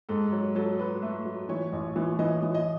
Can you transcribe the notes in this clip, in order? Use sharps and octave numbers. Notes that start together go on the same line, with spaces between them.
G#2 A4
F#3
F#3 A4
F#3 B4
A3
F#3
E3 C#5
A1
E3
E3 D#5
E3
D#5